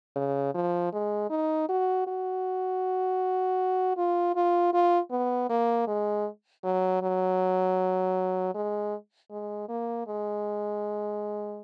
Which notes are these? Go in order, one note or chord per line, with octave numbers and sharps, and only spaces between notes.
C#3
F3
G#3
D#4
F#4
F#4
F4
F4
F4
B3
A#3
G#3
F#3
F#3
G#3
G#3
A#3
G#3